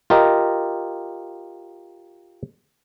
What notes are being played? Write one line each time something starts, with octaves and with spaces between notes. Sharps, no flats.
F4 G4 A#4 D#5